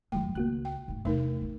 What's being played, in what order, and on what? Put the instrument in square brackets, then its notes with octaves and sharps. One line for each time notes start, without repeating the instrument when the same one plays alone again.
[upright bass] G#1 F2 [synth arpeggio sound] D#3 F#3 A3 [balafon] G5
[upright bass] C#2 [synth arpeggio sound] A#3 F#4 F#6
[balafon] G5
[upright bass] G#2 A3
[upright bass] E2 C3 [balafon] A3 D#4 A#4
[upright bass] A1